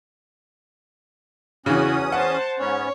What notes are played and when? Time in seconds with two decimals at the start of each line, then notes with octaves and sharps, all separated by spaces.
1.66 E2 C#3 E3 C#4 F#4 D#6
2.12 C5 F#5 A5
2.59 G#2 B3 C#4 C#5